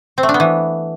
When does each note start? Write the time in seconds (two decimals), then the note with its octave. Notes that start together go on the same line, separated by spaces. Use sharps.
0.18 C4
0.23 A3
0.29 D4
0.34 B3
0.40 E3